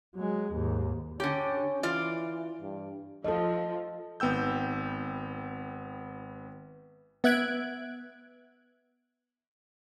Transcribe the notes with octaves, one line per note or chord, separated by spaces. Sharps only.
F#3 G#3
D#2 G#2
D3 C#4 G4
E3 F4 D5
G2
F3 A4 D#5
G#1 B3 G5 E6 G6
B3 E5 F#6 G#6 D7